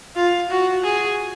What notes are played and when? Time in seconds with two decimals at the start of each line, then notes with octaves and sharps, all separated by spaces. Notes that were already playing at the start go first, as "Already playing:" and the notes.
0.16 F4
0.50 F#4
0.84 G#4